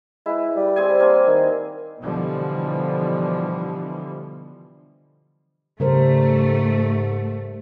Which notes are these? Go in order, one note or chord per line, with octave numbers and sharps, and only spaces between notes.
G#3 E4 B4
G3
C4 G#4 G#5
A#3 C4 G#5
D#3
B2 D3 E3 F3 G3
G#2 C#3 G3 A3 A#4 C5